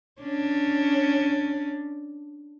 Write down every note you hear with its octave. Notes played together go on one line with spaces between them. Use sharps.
C#4 D4